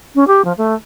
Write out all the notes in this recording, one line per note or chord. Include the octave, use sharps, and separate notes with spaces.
C#4
G4
F3
A3